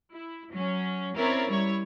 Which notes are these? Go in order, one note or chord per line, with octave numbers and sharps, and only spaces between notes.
E4
F#3 C#4
C4 C#4 E4 A#4 C#5 D5
G3 E4 C#5